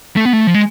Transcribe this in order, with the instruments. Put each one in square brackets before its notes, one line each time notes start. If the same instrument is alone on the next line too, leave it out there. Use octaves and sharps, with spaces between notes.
[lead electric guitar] A3
B3
A3
F3
G#3